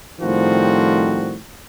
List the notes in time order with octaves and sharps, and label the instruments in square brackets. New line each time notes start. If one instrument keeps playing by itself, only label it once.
[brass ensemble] A2 D#3 F3 G3 C4 F#4